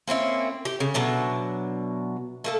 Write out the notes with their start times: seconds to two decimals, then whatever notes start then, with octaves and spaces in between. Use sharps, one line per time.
0.07 A#3 C4 C#4 E4
0.65 G4
0.80 C#3
0.94 B2 F#3 D4 E5
2.44 A3 A#3 A4